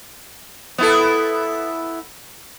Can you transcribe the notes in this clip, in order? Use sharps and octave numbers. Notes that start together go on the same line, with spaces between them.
B3 E4 A4